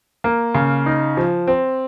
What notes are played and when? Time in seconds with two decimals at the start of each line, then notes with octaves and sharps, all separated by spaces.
0.24 A#3
0.55 C#3
0.86 D#4
1.17 F3
1.47 C4